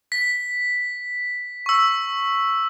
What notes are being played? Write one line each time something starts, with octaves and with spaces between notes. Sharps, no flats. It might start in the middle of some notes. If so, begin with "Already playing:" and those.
B6
C#6 E6